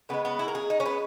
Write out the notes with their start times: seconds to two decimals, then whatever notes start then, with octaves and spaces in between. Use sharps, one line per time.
0.09 C#3 E3 G#3 B3
0.25 B3
0.39 E4
0.48 A#4
0.55 G#4
0.70 D#4
0.80 C#4
0.86 B3